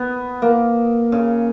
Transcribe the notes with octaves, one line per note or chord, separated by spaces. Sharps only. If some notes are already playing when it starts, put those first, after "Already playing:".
Already playing: B3
A#3
C#3